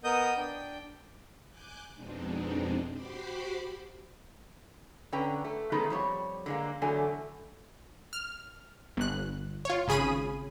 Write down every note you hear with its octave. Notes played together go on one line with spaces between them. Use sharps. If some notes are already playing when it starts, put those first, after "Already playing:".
B3 A#4 D#5 D#6 G6
D4 G5
G#5 D6 F#6 G6
F2 B2 G#3 C4 D4 D#4
F#4 G4 C5 B5 C6 D6
D3 C#4 B4 G5 A#5
A3
D#3 G#3 A3 B3 C#4 D#4
F2 G3 C#5
D3 G#3 A#3
E2 D3 F#3 A3 G#5
F6
G1 F#6
F4 C#5
G#1 C#3 G#4 B5 D#7